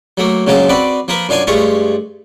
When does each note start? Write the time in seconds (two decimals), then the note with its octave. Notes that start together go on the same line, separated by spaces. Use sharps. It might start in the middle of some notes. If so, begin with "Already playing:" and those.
0.17 F#3 A3 A#3
0.47 A#1 C#3 F#3 G#3 F4 A5
0.69 C4 F#4 B4 D5 G5
1.08 F3 A#3 A#4 B4
1.29 F#2 D4 F4 F5 G#5 C6
1.47 G2 G#3 A3 F4 C#5